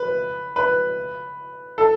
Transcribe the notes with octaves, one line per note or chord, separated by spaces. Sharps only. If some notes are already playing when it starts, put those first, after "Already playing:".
Already playing: B4
B4
A4